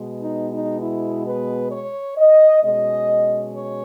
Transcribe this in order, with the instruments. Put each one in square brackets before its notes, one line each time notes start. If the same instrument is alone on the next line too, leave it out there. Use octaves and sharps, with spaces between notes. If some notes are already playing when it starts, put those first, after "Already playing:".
Already playing: [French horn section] B2 G#3 B3
D#4
D#4
E4
B4
C#5
D#5
B2 G#3 C#4 D#5
C#5